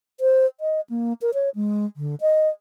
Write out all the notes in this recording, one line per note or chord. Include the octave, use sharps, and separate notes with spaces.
C5
D#5
A#3
A#4
C#5
G#3
D3
D#5